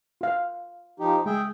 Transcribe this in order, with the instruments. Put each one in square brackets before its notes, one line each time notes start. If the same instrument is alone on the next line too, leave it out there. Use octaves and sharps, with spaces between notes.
[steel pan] F4 F5
[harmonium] F3 D#4 G4
[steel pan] G#3 [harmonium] G#4 E5 G5